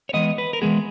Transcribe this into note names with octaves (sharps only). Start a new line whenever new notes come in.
C#5
E3 G#3 B3 D#5
B4
A#4
E3 G#3 B3 G#4